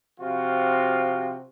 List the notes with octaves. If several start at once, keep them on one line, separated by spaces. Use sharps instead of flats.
C3 F3 F4 F#4